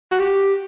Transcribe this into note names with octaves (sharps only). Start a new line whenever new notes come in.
F#4
G4